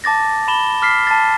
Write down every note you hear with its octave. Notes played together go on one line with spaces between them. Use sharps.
A5 D6 A6 A#6
B5 E7 G7
D6 F6 B6 C7
A5 A6